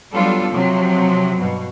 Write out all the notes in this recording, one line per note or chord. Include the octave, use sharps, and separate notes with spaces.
F#3 G3 B3 D4 F4 A4
C3 F3 F#3 C4
G2 B2